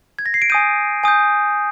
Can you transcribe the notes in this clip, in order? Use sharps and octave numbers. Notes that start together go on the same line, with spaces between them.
G#6
A#6
C7
D7
G#5 D#6 G6 D#7
G#5 D#6 G6